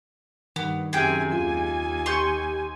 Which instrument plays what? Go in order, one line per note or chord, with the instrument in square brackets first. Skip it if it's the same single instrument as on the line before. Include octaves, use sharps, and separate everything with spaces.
[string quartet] G2 [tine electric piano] D#3 [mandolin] B3
[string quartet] F#2 C3 G#5 [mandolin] G#4 G5
[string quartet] D#2 G#5 [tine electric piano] F4
[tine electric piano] G4 G6 [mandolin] C6 C#6